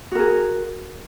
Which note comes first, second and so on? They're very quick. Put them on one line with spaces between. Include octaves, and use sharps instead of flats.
F#4 A#4 G#4